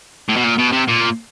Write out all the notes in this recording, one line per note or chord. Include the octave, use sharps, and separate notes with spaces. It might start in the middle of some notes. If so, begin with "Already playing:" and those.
A2
B2
A#2
B2
C3
A#2